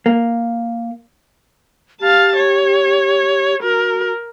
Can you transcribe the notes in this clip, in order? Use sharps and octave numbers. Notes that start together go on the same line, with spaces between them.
A#3
G4 F5 A5
C#5
F#4 A#4